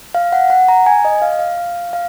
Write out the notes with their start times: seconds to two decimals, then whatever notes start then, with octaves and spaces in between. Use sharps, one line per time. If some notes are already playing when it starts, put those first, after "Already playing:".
0.15 F5
0.32 F#5
0.50 F#5
0.69 A#5
0.86 G#5
1.05 D#5
1.22 F5
1.39 F5
1.58 F5
1.93 F5